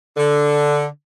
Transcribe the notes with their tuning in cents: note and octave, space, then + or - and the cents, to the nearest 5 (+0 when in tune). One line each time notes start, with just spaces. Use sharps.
D3 +0